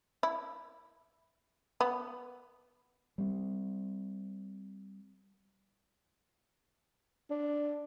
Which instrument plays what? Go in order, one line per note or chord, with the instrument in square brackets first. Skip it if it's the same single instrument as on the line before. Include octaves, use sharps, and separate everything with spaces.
[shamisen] E4
B3
[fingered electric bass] G3 C4
[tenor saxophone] D4